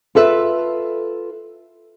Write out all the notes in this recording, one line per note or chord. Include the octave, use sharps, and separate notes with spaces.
F4 A4 B4 E5